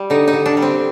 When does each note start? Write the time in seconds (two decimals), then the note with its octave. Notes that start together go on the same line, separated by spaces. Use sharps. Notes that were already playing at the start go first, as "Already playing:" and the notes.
Already playing: G3
0.10 D3 D#4
0.28 D#4
0.33 D3
0.46 D4
0.57 G3
0.62 C4